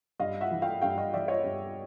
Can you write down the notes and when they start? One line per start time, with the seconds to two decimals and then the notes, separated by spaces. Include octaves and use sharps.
0.19 G2 D#5 F5
0.41 E5 F#5
0.51 E3
0.62 F5 G5
0.82 G2 F5 G5
0.98 D#5 F5
1.14 E3 D5 E5
1.28 C#5 D#5
1.44 G2